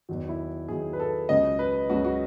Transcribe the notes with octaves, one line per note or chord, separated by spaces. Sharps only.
E2 D#3 F#3
E4
E2 D#3 F#3 G#4
B4
A4
C#2 C#3 F#3 D#5
B4
C#2 C#3 F#3 F#4
F#4